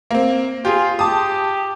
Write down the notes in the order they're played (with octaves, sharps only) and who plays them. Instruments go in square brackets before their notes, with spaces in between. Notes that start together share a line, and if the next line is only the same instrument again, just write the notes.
[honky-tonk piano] A#3 C4
[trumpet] F4 [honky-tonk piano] G4 G#4
[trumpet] G4 [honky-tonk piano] A5 D#6